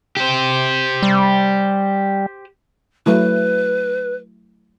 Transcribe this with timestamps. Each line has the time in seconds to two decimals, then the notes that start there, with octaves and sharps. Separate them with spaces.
0.17 G4 C5
1.02 G3
3.06 F#3 A3 E4 B4